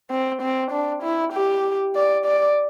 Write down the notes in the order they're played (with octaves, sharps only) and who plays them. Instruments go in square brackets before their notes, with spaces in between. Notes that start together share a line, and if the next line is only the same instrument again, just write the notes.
[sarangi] C4
C4
D4
E4
G4
D5
D5